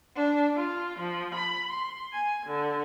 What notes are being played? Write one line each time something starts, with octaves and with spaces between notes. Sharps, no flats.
D4
F4
F3
B5
C6
G#5
D3